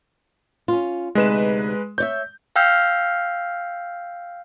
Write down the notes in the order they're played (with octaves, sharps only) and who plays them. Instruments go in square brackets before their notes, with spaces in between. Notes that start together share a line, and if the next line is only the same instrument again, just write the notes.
[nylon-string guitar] C#4 F4
[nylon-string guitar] D2 C3 D#4 [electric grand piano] G#3 B4 E7
[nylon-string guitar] C#5 D5 E5 [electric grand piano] G6
[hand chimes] F5 G5 E6 F6 G6 C7